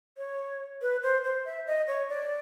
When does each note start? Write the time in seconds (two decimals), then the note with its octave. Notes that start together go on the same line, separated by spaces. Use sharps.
0.18 C#5
0.82 B4
1.03 C5
1.24 C5
1.45 E5
1.67 D#5
1.88 C#5
2.09 D5